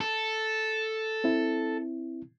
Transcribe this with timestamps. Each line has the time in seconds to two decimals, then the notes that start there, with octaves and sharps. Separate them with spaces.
0.01 A4
1.24 C4 E4